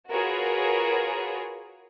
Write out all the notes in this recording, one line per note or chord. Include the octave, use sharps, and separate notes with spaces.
F4 F#4 G#4 A#4 B4 C#5